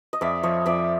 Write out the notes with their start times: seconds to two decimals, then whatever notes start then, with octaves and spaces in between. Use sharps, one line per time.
0.13 D#5
0.21 F2 D5 E5
0.43 F3 C#5 D#5
0.66 F2 D5 E5